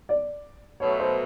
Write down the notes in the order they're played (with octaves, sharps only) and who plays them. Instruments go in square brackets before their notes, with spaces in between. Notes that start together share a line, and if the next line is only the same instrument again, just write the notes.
[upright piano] D5
[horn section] B2 F#3 A3 [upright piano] C#5
[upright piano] C5